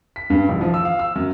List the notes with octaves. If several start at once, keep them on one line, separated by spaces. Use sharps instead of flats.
B6
G2
A1
F3
E6
F5
E6
F#2